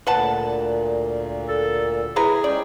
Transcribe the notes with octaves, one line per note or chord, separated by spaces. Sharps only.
D2 A#2 B4 F#5 A5
A4
E4 G#4 B4 A#5
G#2 C#4 D5 G5